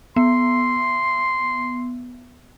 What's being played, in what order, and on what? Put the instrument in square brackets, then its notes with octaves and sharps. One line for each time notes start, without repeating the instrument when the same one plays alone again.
[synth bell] B3 [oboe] C6